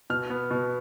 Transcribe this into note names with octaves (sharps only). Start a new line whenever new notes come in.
B2 F6
B3
B2